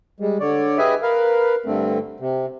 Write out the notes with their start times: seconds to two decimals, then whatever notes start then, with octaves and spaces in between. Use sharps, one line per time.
0.20 G3 G#3
0.40 D3 C#5 D5
0.78 G4 G#4 B4 D#5 E5 G#5
1.02 A#4 B4 F5
1.66 G2 D3 A3 C4
2.20 C3